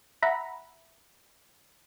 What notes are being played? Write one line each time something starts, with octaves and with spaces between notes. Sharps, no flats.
E5 F#5 A#5 B5